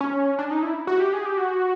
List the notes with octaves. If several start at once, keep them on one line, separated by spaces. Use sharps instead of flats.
C#4
D4
D#4
E4
F#4
G4
G#4
G4
F#4